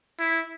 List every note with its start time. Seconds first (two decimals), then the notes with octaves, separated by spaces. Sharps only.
0.19 E4